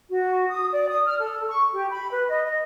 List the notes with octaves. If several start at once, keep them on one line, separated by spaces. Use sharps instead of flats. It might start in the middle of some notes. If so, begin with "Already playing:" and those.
F#4
D#6
D5
D#6
F6
A4
C#6
G4
B5
B4
D#5
D#5